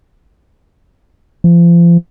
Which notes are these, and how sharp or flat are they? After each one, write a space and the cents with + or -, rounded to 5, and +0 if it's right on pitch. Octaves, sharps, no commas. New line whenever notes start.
F3 -35